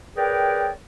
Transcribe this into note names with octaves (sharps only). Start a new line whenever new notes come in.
G#4 A#4 B4 C#5 D5 G5